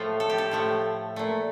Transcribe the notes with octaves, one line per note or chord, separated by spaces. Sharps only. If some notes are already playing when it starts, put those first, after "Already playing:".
Already playing: A2 F3 A3 F4
A4
G4
A4
A2 F3 A3
A#2 A3